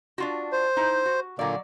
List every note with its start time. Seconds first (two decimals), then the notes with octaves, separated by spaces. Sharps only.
0.18 D4 F4 F#4
0.53 C5
0.77 D#4 E4
1.05 F#4
1.39 A#2 D3 F#3 A#3 D5